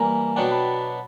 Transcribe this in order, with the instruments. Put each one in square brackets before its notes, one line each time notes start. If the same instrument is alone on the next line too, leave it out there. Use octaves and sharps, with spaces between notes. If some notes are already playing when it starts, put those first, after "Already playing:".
Already playing: [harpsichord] E3 G3 A#3 [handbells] G#5 A#5
[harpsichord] B2 F#3 B3 D4 [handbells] G5 A5
[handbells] A5 B5